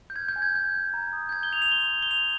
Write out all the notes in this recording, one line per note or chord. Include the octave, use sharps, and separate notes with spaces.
G6
F6 G#6
G6
G#5
G#6
G#5 G6
G#5
A#5
D#6
G6
A#5 G#6
G7
D#6 F7
F7
C6 G7
C6
G7
C6 F7